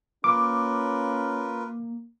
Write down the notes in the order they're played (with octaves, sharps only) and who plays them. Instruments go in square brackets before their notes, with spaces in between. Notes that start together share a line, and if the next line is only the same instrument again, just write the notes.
[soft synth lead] A#3 [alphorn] C#4 [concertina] F4 A#4 B4 [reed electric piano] D6